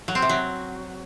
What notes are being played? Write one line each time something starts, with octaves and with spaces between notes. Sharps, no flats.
F#3
C4
C3
F#3